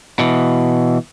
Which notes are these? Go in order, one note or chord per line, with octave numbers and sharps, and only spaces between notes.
B2 E3